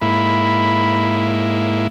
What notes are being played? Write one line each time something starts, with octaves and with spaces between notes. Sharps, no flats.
G#2 A#3 E4 B5